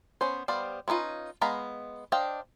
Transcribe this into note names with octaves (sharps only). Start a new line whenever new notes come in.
B3 C#4 C5
G3 B3 C5 D5 F5
C4 C#4 D#4 F4 B4
G#3 B3 F5 A#5 B5
D4 C5 D#5 F5 G5